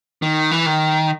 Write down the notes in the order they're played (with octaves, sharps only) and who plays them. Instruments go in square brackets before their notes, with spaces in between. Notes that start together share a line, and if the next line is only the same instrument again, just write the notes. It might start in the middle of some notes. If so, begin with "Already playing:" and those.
[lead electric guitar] D#3
E3
D#3